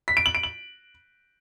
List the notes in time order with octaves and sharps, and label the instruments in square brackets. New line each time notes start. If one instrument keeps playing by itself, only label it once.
[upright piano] B6
D7
F#7
D7
F#7